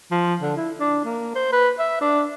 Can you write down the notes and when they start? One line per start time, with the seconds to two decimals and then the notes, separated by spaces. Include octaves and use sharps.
0.11 F3
0.42 D3
0.57 E4
0.80 D4
1.05 A#3
1.35 C5
1.53 B4
1.79 E5
2.01 D4